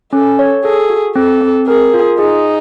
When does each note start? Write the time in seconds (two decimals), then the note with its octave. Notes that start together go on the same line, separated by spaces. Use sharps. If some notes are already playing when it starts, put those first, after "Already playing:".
0.13 C#4 A4
0.39 C#5
0.65 G#4 A4
0.90 F#4
1.16 C4 A4
1.41 C4
1.67 G#4 A#4
1.94 F4
2.19 D#4 G#4